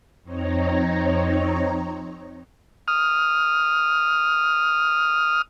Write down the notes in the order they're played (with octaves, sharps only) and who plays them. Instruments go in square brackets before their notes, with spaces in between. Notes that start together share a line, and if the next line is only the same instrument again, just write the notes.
[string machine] F2 C4 D#4 C#5 A#5
[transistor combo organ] D#6 F6